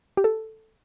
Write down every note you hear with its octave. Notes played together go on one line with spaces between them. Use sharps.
G4
A4